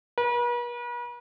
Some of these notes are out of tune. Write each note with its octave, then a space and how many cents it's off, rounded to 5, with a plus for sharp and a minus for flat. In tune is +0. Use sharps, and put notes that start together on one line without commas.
B4 -45